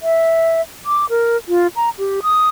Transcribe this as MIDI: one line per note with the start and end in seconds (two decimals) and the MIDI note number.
0.02 0.61 76
0.86 1.05 86
1.10 1.37 70
1.48 1.67 65
1.76 1.90 82
1.98 2.20 67
2.23 2.49 87